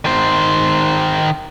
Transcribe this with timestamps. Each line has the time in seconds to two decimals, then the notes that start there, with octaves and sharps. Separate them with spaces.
0.05 D#3 C5